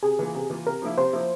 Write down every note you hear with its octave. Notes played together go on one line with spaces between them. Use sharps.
C3 G#4
E3 A#3 F4
C3
E3 A#3 F4
C3 A#4
F3 A#3 E4
C3 C5
F3 A#3 E4